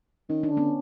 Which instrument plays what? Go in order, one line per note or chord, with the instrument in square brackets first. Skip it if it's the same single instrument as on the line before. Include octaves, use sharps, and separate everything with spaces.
[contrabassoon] D#3 [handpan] C#4
[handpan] D4
[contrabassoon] D3
[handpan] B3 C#4